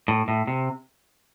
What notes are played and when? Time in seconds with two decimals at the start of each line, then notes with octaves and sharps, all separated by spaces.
0.08 A2
0.28 A2
0.47 C3